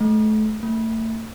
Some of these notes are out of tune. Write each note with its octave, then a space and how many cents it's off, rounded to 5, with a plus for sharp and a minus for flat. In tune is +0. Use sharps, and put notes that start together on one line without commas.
A3 -30
A3 +35